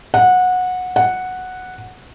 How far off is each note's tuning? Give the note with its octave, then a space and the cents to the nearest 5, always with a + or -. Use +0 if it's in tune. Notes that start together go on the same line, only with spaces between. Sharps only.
F#5 -20
F#5 -5